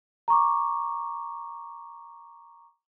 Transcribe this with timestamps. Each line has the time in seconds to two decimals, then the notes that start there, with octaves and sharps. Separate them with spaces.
0.28 A#5 C#6 D6